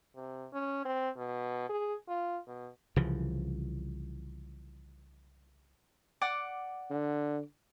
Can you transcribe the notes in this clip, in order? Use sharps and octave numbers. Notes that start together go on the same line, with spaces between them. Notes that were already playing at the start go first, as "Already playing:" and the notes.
C3
C#4
C4
B2
G#4
F4
B2
C2 C#3 E3 F3
D5 F#5 D6
D3